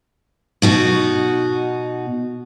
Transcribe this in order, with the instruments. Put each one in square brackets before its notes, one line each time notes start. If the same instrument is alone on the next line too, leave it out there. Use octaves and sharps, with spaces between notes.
[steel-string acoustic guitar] B2 D#4 F#4